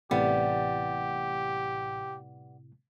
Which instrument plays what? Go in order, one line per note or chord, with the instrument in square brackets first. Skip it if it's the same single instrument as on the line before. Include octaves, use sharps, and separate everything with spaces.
[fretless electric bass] A1 [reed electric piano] A2 C3 E4 [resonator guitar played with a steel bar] G3 B3 [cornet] G4